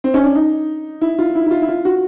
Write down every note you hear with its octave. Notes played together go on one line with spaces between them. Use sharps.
C4
C#4
D4
D#4
E4
F4
E4
E4
F4
E4
F4
F#4